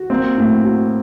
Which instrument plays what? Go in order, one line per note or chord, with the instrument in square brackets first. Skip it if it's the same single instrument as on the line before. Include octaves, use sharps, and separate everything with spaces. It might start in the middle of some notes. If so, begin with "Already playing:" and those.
Already playing: [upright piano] F#4
[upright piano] A#3 [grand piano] C4
[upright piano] A2
F#4